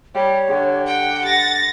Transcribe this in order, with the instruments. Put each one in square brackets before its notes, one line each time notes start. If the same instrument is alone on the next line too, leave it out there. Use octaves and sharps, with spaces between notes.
[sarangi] G3 [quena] C#5
[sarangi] D3 [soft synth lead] G4
[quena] F#5 [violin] G5
[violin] A6 A#6